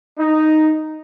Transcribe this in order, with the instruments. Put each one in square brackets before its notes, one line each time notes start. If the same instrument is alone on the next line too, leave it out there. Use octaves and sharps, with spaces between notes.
[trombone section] D#4